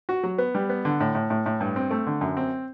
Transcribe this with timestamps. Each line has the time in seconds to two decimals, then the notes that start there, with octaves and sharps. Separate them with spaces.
0.09 F#4
0.23 F#3
0.38 B3
0.55 G3
0.69 B3
0.85 D3
1.00 A2
1.15 A2
1.30 A2
1.46 A2
1.61 G2
1.76 C4
1.91 A3
2.07 D3
2.21 F#2
2.37 C4